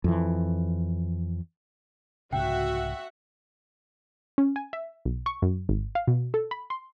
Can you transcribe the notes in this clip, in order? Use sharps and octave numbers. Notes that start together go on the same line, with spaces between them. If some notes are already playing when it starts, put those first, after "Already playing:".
F2 E3
C2 G#2 C#3 F#4 E5 F#5 G5
C#4
G#5
E5
B1
C#6
F#2
G#1
F5
B2
A4
B5
C6